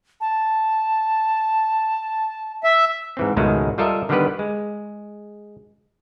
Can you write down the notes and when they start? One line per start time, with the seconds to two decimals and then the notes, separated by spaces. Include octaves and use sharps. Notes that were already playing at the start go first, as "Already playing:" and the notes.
0.21 A5
2.64 E5
3.17 G#2 E3 C4
3.37 C#2 G#2 B2 D#3 G#3 A3
3.78 G3 F4 A4 A#4 D#5 E5
4.09 D3 D#3 G3 B3 G4 B4
4.39 G#3